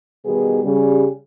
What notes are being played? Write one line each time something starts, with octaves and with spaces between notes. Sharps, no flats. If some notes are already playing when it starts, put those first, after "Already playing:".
B2 D#3 G3 B3 G#4
C#3 G3